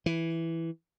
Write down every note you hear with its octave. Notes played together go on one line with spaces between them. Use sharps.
E3